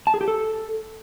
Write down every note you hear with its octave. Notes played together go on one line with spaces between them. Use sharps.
A5
G#4
G4
A4